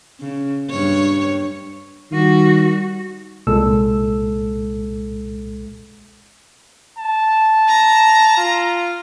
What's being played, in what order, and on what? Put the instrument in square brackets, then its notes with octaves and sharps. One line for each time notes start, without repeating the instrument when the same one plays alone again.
[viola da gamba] C#3
G2 C#5
[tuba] D#3 [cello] G3 F#4
[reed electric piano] C2 A#2 G#3 A4 E6
[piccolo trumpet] A5
[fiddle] A#5
[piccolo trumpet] F4